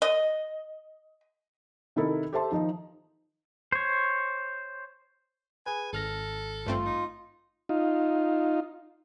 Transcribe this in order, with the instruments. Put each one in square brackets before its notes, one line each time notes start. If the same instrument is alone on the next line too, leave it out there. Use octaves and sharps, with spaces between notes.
[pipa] D#5
[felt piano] C3 D#3 D#4 E4 A4 A#4
G4 A4 C5 E5 A5 C6
D#3 F3 D#4
[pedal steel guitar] C5 C#5
[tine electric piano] G#4 B4 [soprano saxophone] G#5
[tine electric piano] G#1 F6 A#6 [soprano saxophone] A4
[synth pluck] G2 A3 C4 [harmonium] F4
[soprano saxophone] D#4
[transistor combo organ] D#4 F4